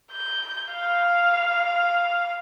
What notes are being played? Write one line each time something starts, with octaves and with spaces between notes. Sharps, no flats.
G6
F5